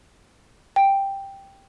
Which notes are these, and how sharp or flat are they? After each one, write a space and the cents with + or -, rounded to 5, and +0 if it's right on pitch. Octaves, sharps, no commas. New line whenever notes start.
G5 +5